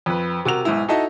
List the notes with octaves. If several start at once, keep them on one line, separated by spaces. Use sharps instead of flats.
F2 B4
C3 F#4 A#4 F7
B1 G#2 E4
D#4 E4 F#4 A4 D#5 E5